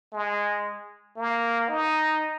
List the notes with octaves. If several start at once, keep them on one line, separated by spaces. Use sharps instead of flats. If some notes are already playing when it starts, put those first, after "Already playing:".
G#3
A#3
D#4